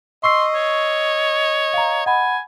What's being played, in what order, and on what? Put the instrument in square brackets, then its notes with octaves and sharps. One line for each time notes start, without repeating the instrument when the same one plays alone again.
[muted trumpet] D#5 [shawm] C6 [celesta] C#6 E6 C7
[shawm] C#5
[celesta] F5 A#5
[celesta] F#5 B5 [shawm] G#5